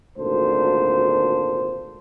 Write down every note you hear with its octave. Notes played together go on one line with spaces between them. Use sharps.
G#1 D2 A#2 A4 C5